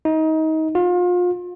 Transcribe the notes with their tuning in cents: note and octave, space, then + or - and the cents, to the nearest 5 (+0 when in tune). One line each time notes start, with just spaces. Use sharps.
D#4 +25
F4 +35